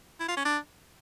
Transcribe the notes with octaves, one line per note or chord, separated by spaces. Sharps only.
E4
F4
C#4
D4